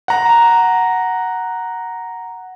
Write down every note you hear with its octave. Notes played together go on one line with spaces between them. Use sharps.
F#5 A#5